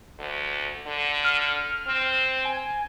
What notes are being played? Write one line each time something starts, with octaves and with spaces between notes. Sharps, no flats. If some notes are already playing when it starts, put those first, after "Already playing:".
D2
D3
F6
C4
G#5